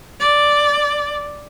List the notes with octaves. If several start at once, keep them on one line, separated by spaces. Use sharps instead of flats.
D5